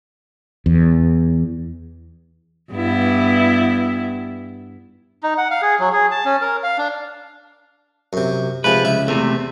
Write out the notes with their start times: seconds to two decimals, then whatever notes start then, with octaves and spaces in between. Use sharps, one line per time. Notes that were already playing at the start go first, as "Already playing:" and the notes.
0.66 E2
2.72 G2 B3 E4
5.23 D#4
5.38 F#5
5.51 F5
5.62 G#4
5.80 F#3
5.93 G#4
6.11 A5
6.25 C#4
6.41 A#4
6.63 F5
6.78 D4
8.13 F#2 C3
8.64 C3 F3 G#3 B4
8.85 C#2 E4
9.08 E2 C3 A3